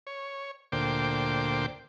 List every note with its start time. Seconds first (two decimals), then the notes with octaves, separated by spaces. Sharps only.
0.07 C#5
0.72 D2 A#2 C5 G5 D6